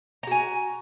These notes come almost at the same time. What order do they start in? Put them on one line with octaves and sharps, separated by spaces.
A#5 F#4 G#5